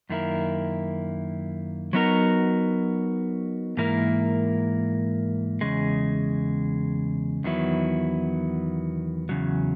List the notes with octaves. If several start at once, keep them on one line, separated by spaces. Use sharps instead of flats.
F#2 D#3 A#3 E4 A#4
F#3 B3 D#4 F#4 A#4
G#2 E3 A#3 E4 A#4
E2 C#3 G#3
E2 D#3 F#3 B3 E4
E2 C#3 F#3